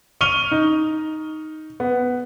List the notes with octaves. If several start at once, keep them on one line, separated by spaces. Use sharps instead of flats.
C#6 F6 D#7 F7 G7
D#4
B3